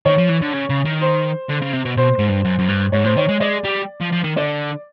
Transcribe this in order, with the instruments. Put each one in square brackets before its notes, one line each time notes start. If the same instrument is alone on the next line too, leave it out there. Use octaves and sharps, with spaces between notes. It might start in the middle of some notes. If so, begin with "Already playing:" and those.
[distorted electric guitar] D#3 [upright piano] C#5
[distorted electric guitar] F3
E3
D3
C#3
C#3
D#3
[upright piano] C5
[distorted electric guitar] D3
C#3
C3
B2
[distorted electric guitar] B2 [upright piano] C5
[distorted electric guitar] G#2
G2
F#2
F#2
G2
[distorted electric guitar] G#2 [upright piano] C#5
[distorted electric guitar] A2 [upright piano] C5
[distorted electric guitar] D#3 [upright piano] C#5
[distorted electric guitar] G#3
[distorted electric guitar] G#3 [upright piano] D5
[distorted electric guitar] G3
F3
F3
D#3
[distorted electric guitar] D3 [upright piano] D5